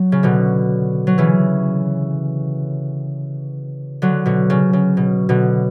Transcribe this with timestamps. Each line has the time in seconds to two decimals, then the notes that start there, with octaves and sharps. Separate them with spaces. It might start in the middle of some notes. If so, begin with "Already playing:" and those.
Already playing: F#3
0.12 C#3
0.23 B2 D3
1.07 F#3
1.18 C#3 E3
4.02 D3 F#3
4.26 B2 D3
4.50 C#3
4.73 C#3
4.97 B2
5.29 B2 D3